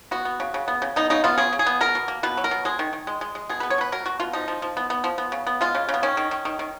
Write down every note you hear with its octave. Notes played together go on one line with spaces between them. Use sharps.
B3 F#4
B3
C#3
C#3
B3
C#3
B3 D#4
C#3 D#4
B3 F4
C#3 G#4
C#3
G#4
B3
B2 A#4
B2
A#3
B2 B4
F#3
A#4
B2
G#3 G#4
D#3
D#3
G#3
G#3
G#3
B2 G#4
B3 B4
C#5
B2 B4
F#3 A#4
B2 F#4
B2 F4
F3 D#4
F3
F3
B3
B3
F3
B3
C#3
B3
G#3 F4
C#3
C#3
B3
D#3 C#4
D#3
D#3
D#3
D#3